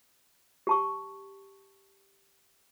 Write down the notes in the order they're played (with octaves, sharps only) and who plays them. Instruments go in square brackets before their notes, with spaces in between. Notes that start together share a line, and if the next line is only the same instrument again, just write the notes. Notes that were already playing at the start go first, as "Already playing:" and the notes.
[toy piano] G4 A5 C#6